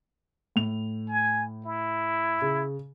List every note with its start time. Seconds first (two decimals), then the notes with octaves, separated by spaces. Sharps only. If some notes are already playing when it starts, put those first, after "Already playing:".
0.56 A2 F7
1.08 G#5
1.66 E4
2.42 C#3